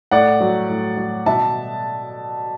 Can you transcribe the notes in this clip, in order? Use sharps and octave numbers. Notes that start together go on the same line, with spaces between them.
A2 D5 F#5
F#3
A2
F#3
B2 E5 A5